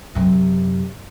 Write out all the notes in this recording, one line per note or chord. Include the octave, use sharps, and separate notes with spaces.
F#2 C3